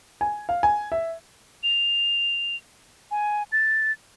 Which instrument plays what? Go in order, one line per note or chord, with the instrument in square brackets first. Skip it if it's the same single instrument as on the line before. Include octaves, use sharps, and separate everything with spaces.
[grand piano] G#5
F5
G#5
E5
[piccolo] F7
G#5
A6